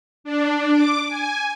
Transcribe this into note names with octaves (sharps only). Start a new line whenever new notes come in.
D4
D6
G#5